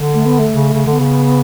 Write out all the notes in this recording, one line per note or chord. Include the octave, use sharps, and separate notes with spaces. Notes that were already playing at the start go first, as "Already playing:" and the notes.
Already playing: D3
A3
B3
A3
C#3
C#3
D3
B3
C#3